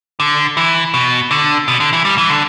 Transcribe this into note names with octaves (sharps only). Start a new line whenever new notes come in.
D3
E3
B2
D3
B2
D3
E3
G3
E3
D3